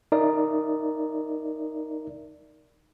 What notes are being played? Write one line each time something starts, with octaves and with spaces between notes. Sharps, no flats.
D#4 A#4 D5 E5